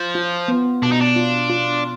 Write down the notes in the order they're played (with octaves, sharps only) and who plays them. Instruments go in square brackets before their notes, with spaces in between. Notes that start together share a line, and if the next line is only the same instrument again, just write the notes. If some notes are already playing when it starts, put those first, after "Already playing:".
Already playing: [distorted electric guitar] F3
[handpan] F4
B3
[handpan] B2 [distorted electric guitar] D4
[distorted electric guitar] D#4
D4
[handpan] F4
F4